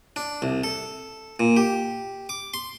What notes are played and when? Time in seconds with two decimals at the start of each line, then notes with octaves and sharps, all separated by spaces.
0.16 D4
0.42 C2
0.64 A4
1.40 A#2
1.57 G4
2.29 D6
2.54 C6